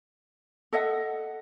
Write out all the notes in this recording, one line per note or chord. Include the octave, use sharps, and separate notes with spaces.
A4 D#5 E5 F#5